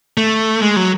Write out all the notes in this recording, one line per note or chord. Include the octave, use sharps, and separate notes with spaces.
A3
G#3
F#3